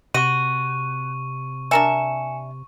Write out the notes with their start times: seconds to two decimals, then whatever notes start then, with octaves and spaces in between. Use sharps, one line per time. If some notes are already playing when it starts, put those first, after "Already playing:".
0.14 C3 F#4 C#6 D#7
1.71 D4 A#4 E5 G#5 C#7 E7